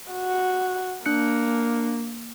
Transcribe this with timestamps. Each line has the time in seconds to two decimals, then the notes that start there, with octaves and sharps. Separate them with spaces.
0.12 F#4
1.06 A#3 D4 F#6 C#7